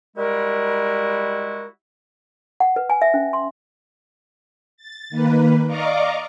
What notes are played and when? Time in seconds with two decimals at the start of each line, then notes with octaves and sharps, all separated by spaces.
0.16 G3 G#3 E4 F#4 A#4
2.60 F#5
2.76 B4
2.90 G#5
3.02 E5
3.14 C#4
3.33 C6
4.77 A6
5.10 D#3 A#3 B4
5.67 D5 D#5 F5 A#5 C#6 D6